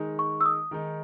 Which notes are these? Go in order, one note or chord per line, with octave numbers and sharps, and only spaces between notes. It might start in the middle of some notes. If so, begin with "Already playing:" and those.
Already playing: D#3 G#3 D#4
C#6
E6
D#6
D#3 G#3 D#4